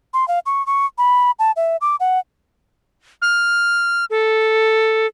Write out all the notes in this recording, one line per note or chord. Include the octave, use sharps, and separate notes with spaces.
C6
F5
C#6
C#6
B5
A5
E5
D6
F#5
F6
A4